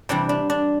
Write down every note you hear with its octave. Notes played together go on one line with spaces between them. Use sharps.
C3 E3 G3 D4
D4
D4